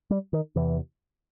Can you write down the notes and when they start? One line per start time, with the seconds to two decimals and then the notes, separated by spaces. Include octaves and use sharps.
0.10 G3
0.33 D#3
0.56 E2 C3 E3